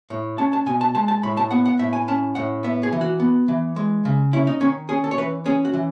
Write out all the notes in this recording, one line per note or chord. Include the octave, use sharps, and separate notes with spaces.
A2
C#4 A5
A5
B2 G#5
A5
G#3 A5
A5
A2 B5
A5
B3 F#5
F#5
A2 E5
G#5
C#4 A5
A2 F#5
B3 E5
G#4
E3
F#4
B3
E3
G#3
C#3
C#4 E4
D#4
D#3 C#4
C#4 G#4
A4
C#5
E3 B4
C#4 G#4
F#4
E3